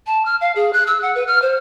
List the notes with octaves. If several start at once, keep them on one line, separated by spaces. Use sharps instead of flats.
A5
F6
F5
G#4
F#6
E6
F#5
B4
F6
C5